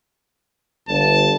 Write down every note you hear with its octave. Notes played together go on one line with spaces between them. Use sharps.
G1 A5